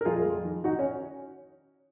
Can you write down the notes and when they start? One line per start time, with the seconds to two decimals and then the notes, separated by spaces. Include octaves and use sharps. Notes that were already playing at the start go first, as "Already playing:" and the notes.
0.01 A#4
0.05 F2 F4 G#4
0.26 F2
0.45 D#3
0.64 D#3 D#4 F#4
0.79 C#4